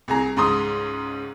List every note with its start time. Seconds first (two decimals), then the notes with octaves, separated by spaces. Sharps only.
0.08 C2 G#4 A#5
0.37 C#2 G#2 A#5 C6 D#6